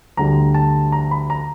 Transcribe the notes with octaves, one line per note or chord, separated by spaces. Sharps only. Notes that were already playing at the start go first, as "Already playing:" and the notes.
D2 D3 G3 A#5
A5
A#5
B5
A#5